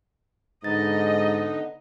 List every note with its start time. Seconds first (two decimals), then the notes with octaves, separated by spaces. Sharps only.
0.64 G#2 D3 B3 D#4 D#5 A6